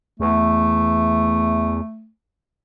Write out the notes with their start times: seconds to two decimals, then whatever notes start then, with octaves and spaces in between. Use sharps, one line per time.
0.20 E2 A3